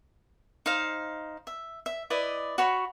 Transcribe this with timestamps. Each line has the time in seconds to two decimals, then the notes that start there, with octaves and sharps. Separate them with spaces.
0.66 D#4 C5 F5
1.47 E5
1.86 E5
2.10 E4 B4 D5 D#5
2.58 F#4 C#5 B5